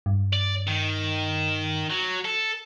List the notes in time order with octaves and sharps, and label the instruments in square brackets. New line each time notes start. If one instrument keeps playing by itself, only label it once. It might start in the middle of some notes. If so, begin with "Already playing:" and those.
[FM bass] G2
[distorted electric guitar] D5
D#3
F#3
A4